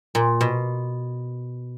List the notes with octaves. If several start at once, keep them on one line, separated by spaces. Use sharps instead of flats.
A#2
B2